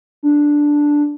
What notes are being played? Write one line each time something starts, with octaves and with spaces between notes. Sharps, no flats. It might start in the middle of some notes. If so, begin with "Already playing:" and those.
D4